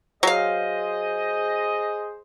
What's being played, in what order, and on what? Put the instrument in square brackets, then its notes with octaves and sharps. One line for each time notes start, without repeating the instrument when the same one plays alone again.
[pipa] F#3 F5 [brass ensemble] G#4 C5 D#5